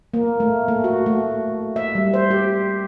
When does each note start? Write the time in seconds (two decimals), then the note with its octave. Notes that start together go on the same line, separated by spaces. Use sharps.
0.14 A#3
0.40 A3
0.68 A3
0.84 F#4
1.06 A3
1.76 E5
1.95 G3
2.14 C5
2.31 G4